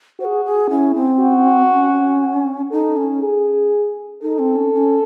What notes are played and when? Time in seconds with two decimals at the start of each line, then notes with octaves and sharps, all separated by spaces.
0.19 F#4 C5
0.25 G#4
0.45 G#4
0.70 C#4 E4
0.95 C4
1.20 F#4
1.71 C#4
2.71 D#4 A4
2.97 C#4
3.21 G#4
4.22 D#4 A4
4.39 C4
4.56 C#4
4.73 C#4